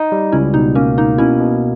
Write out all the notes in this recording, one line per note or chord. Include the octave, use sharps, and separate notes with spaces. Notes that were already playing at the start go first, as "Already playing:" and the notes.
Already playing: D#4
G3
C#2 C#4 E4
B2 D#4
A#3 C#4
A#3 D#4
B2 C#4 E4
B2